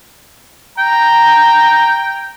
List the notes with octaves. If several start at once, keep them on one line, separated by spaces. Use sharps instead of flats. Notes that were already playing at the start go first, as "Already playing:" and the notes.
G5 A#5